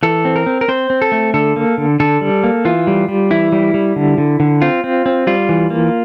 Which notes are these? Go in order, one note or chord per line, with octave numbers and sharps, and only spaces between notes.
E3 A4
C4
A#4
C4
A#4
C4 C5
C4
A4
A3
D3 A4
A#3
D3
D3 A4
G3
A#3
E3 F4
G3
G3
E3 E4
G3
G3
D3
D3
D3
C4 F4
C4
C4
G3 F4
E3
A#3